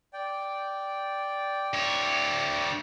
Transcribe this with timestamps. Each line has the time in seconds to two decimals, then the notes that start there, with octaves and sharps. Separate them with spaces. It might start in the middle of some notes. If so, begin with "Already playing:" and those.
0.13 D5 G5
1.74 D2 C#5